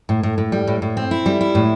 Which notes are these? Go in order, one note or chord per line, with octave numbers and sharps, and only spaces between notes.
A2
A2
A2
G3
A2
A2
C4
E4
G3
E4
A2